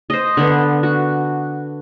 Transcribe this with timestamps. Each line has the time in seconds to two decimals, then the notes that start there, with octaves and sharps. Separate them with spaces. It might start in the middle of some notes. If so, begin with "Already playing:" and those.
0.10 C5 D#5
0.37 D3 B3
0.83 F#4